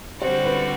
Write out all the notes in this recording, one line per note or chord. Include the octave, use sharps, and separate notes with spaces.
D3 G3 C4 F#4 C5
B4